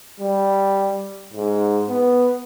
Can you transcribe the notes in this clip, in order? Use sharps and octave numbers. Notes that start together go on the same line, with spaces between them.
G3
G#2
B3